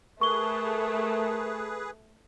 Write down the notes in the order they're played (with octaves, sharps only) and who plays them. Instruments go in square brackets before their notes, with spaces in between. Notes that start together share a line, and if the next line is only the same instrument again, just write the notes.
[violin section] A3 [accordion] G#4 B4 [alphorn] A#4 [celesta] C#6 G7